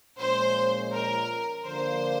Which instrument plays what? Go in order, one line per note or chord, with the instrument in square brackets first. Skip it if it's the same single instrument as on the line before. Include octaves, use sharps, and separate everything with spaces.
[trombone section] A#2 F3 G#3 C#4 [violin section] C5
[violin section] A#4
[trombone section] D3 F3 A#3 [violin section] C5